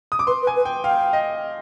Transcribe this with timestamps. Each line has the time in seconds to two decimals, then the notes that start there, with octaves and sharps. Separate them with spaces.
0.12 D#6
0.19 D6
0.27 B4 C6
0.42 B4
0.47 G#5
0.56 B4
0.65 G5
0.84 F5 G5
1.13 D#5